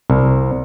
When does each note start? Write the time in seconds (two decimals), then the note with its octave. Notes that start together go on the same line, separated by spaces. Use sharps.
0.10 C2